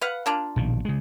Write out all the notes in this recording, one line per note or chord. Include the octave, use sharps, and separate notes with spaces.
B4 F5 F#5
A#3 D4 F4
A#1 B2 D#3
C#3 G#3